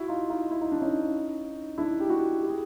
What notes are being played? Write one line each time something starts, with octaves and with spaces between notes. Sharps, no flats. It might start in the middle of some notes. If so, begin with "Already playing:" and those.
Already playing: E4 F#4
D#4 F4
D#4 F4
E4
D#4
D4
C#4 D#4
D4 E4
G4
E4 F#4
G4
G#4